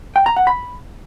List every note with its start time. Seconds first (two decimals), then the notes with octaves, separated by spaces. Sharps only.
0.16 G5
0.26 A#5
0.36 F#5
0.47 B5